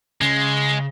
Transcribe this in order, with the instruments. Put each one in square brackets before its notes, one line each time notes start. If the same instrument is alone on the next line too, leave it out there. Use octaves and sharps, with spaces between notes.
[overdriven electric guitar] C#3 [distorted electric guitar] G#3